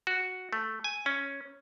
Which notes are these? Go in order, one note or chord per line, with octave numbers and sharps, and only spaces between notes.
F#4
A3
G#5
C#4